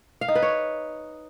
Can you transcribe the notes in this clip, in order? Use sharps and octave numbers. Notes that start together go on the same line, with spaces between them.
F5
D#4
B4
C#5